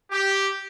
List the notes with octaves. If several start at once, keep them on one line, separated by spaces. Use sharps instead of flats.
G4